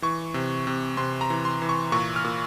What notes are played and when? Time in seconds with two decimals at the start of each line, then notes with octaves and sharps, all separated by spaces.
0.02 E3 C#6
0.34 C3
0.67 C3
0.97 C3 C6
1.21 A#5
1.30 E3
1.45 C6
1.62 E3
1.69 C#6
1.92 A#2 C#6
2.16 F6
2.25 A#2